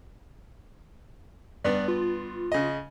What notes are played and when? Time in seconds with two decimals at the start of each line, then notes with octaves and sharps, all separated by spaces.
1.64 G2 B3 D5
1.88 F4
2.52 C#3 D#5